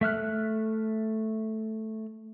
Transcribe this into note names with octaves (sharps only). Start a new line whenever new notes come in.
A3 E5 F6 F#6